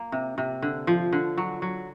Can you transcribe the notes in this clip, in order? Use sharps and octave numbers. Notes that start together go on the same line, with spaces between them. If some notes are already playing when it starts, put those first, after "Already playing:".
Already playing: A#3
C3
C3
D3
F3
D3
F#3
F#3